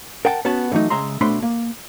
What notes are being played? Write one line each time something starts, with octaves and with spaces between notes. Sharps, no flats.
A#4 F#5 G5 A5
B3 C#4 F#4 A5
D3 E3 F#3 A3 D#4
C#3 G#3 E5 A#5 C6
B2 A3 D4 C5 B5 C6
A#3